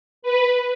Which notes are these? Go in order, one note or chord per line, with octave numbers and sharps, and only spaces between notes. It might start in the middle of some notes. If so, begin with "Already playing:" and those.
B4